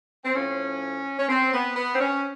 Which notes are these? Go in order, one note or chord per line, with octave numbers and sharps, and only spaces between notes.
C4
A2 F3 C#4
C#4
C4
B3
B3
C4
C#4